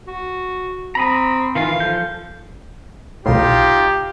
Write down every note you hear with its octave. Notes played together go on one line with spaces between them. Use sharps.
F#4
C4 A#5 B5 D#6
D#3 E3 F4 F5
F3 A4 G6
B1 A2 D#4 F4 G4 C6